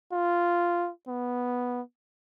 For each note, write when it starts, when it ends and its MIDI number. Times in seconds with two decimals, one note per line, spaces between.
0.12 0.91 65
1.08 1.81 59